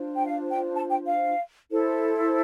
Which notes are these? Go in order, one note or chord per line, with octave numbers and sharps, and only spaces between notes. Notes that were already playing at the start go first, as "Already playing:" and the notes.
Already playing: D4 F4 C5
G5
F5
G5
A5
G5
F5
E4 A4 C5